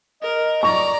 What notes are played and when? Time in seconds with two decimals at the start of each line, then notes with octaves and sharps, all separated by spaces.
0.22 A#4 D#5
0.63 D5 A#5 C#6